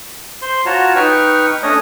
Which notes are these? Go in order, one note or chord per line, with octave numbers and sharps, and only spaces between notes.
C5 C6
F4 F#4 C#5 A5 A#5
D#4 B4 G5 C#6 F6
A3 C#4 D4 C#5 D#5 D#6